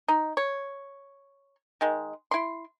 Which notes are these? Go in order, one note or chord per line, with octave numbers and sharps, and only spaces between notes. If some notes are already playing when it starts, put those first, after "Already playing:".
D#4
C#5
D#3 G#3
E4 C6